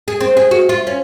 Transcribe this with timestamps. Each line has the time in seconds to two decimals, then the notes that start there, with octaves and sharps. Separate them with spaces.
0.08 G#4
0.20 C4
0.37 G#4
0.51 F#4
0.69 F4
0.87 C#4